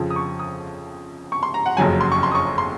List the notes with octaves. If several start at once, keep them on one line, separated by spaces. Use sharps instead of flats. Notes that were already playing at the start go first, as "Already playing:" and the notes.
Already playing: F2 C#3 F3
D#6
C#6
D#6
C#6
C6
A#5
F#5
F#1 F2 C#3 F#3 G#5
C6
C#6
C6
D#6
C#6
C6